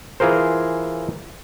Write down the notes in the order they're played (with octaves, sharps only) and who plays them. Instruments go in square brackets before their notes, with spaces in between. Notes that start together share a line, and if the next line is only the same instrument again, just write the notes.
[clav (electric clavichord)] E3 F4 G#4 A#4 C5